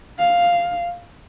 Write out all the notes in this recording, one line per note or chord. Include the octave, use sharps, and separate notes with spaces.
F5